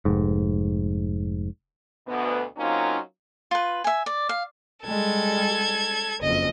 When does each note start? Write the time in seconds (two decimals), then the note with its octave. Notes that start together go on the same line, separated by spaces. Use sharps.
0.05 F1 G#2
2.06 D2 B2 B3
2.58 F#3 A#3 C4 C#4 D#4 F4
3.51 F4 B4
3.84 E5 G#5
4.06 D5
4.29 F5
4.85 G3 G#3 A4 G#6
6.22 F#1 F2 D#5